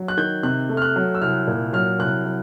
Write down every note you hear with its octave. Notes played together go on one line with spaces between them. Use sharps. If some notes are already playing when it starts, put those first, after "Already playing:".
Already playing: F#3
F#6
D#3 G6
C3 F#6
A3
F6
F#6
F#3
E6
C2 F6
A#2
F#3 F6
C2 F#6
F#3